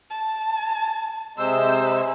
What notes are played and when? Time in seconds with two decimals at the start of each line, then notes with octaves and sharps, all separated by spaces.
0.11 A5
1.38 C3 G#3 C5 E6